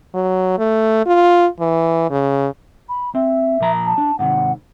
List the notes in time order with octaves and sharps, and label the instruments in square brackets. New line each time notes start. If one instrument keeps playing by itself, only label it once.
[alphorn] F#3
A3
F4
E3
C#3
[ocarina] B5
[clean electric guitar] C4 [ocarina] E5
[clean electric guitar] A#2 F3 A#5
[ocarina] A5
[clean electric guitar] D4
[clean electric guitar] G#2 C3 D#3 [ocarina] F#5